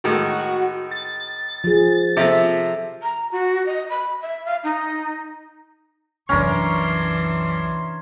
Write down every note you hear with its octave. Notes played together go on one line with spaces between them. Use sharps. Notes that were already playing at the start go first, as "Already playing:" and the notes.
A2 D#3 G#3 F#4
A6
F3 G#4
C3 F3 A4 E5
A#5
F#4
D#5
B5
E5
F5
D#4
C2 F#2 E3 C#4 D4 A#4 C6